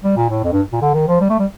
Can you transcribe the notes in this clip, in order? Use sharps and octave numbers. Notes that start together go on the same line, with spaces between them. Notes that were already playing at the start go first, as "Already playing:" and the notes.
G3
A#2
A2
F2
G2
A#2
D3
D#3
F3
G3
A3
G3